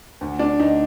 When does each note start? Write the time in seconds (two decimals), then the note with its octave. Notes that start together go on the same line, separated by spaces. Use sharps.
0.21 D2
0.39 D4
0.59 D2 D#4